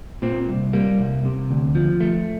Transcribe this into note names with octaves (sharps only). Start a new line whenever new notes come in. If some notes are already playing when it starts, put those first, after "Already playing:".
A#2 C4
C2
G3 A#3
C2
C3
D2
F3
A3